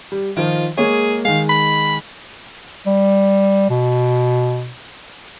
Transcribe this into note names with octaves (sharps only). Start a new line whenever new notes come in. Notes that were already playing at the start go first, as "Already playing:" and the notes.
G3
D#3 F3 F4
G#3 A#3 G#4 C#5
D#3 G#3 F5
B5
G3
B2